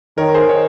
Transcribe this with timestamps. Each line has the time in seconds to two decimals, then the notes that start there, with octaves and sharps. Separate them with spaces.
0.18 D#3 A#4 C#5
0.34 G#4 C5
0.49 A#4 C#5